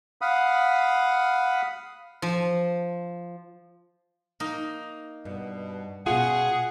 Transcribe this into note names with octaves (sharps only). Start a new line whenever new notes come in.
F5 F#5 B5 D#6
F3
A#3 D#4
G2 B2
B2 B3 C#4 F4 G#4 F#5